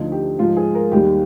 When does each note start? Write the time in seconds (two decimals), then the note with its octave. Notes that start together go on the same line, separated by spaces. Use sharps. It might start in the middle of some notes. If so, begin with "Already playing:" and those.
Already playing: D2 D3 F3 D#4
0.12 G4
0.39 G#2 F3 F4
0.57 G#4
0.75 A#4
0.92 D#2 D#3 G3 G4